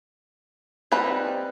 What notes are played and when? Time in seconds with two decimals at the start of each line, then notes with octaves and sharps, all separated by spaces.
0.92 G3 C4 D#4 B4